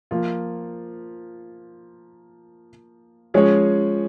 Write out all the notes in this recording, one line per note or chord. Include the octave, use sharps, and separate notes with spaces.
F3 A#3 F4
F3 G#3 C#4 G#4 C#5